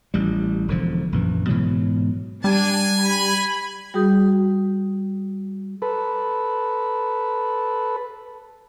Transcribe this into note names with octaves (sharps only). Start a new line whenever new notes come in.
A1 G3
E1 D3 F3
A#1 F#2 E3
G#2 B2 E3 F#3
G3 D4 G#5
B5
G3 F#4 G#4 D#6 G6
A4 B4